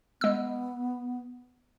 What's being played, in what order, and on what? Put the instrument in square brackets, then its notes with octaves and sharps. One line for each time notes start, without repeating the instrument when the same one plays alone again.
[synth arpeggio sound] G#3 E6 [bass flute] B3